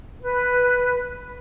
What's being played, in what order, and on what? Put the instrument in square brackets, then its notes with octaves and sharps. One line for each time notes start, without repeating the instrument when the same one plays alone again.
[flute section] B4